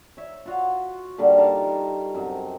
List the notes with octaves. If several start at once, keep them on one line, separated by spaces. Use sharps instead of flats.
C#5 E5
F4 F#4 F5
A#2 D3 G3
D#4 D5 F5 A5
C#6
F#2 C3